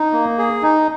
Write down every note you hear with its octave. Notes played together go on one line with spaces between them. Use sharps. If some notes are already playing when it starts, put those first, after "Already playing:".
Already playing: D#4
A#3
G#4
D#4